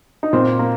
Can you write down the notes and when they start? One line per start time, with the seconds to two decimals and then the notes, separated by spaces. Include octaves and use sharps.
0.23 D#4
0.33 A#2 C4
0.59 A#3